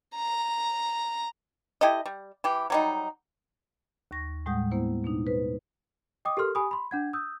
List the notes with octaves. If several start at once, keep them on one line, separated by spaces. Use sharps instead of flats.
A#5
E4 G4 A4 D#5
G3
E3 G4
F#3 G3 D#4
D#2 C#6 A#6
A2 G3 G#3 F#5 D#6 G6
A#3 B3 E4 C5
B2 D4 D#4
B4 C5
D#5 G5 D6 D#6
G4 A4 A#4 C6 F6
G4 G#5 B5 C#6 D#6
B5 C6
D4 F#5 G#6
D#6 E6 G6